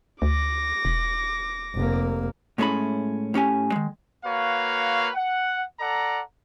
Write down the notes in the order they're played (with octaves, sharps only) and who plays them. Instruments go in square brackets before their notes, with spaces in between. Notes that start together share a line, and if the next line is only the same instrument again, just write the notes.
[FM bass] D2 [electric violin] D6 A#6
[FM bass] E1
[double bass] F1 A#3
[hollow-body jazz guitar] A2 G#3 A3 C#4 E4 B5
A2 C#4 G4 G#5
D#3 G#3
[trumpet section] A#3 F#4 B4 C#5 F5
F#5
A4 D5 F#5 A#5